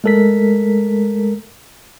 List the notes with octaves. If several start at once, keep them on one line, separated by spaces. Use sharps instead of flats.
G#3 A3 A4 A#4 B6